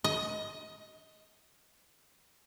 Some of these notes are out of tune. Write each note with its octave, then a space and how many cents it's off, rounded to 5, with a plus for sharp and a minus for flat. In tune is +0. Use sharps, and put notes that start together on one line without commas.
D#5 +20